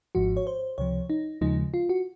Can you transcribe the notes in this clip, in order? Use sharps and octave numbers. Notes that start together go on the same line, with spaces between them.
G#1 G#2 F3 F#4
C#5
C5
C#2 C3 F3 C#5
D#4
D#2 C#3 F3 G#3 D#4
F4
F#4